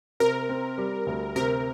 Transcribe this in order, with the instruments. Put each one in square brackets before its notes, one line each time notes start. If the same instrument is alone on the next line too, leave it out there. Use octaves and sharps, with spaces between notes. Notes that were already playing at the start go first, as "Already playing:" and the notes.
[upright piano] C3 [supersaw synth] A#4
[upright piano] C4
G3
D2
[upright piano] C3 [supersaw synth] A#4